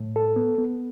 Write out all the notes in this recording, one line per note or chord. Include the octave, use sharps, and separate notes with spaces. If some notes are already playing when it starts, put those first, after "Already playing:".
Already playing: A2
A4
B3
B3